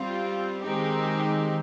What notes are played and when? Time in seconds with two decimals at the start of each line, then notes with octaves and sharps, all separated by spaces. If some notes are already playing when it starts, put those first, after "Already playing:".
Already playing: G3 C4 F4
0.62 D#3 G#3 C4 D#4 G4